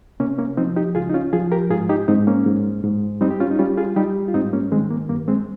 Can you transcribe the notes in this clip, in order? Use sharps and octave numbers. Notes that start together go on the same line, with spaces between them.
C3 A#3 C#4
A#3 C#4
F3 C4 D#4
D#4 G4
C#2 F4 G#4
D#4
C#4 F4
F3 F4 G#4
G4 A#4
G#2 F4 G#4
D#4 G4
G#2 C4 D#4
A#3 C#4
G#2
G#2
G3 C4 D#4
G4
C#4 F4
D#4
G3 C#4 F4
F4 G#4
G3 D#4 G4
F4
G#2 C4 D#4
A#3 C#4
D#3 G#3 C4
A#3
G2 A#3
G#3 C4